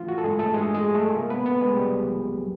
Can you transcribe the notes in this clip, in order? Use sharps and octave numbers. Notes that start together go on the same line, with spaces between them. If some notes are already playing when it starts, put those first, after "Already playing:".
Already playing: E3 A3 F4
F#4
A4
G2 G#3 G#4
A3 A4
G2 G#3 G#4
G#3 G#4
G#3
A3 A4
C3 A#3 A#4
B3 B4
A3 B3 B4
G#3 G#4
C2 G3 G4
F3
F#3